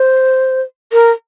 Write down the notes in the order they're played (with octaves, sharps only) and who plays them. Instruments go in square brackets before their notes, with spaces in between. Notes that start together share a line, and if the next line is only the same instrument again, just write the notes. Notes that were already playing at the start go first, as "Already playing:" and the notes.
Already playing: [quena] C5
A#4